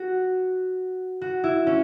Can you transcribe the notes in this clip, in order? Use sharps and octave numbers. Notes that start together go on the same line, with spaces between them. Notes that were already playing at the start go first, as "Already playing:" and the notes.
Already playing: F#4
F#4
E4
C#4